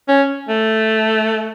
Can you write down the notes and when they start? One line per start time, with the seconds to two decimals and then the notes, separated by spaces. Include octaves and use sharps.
0.08 C#4
0.49 A3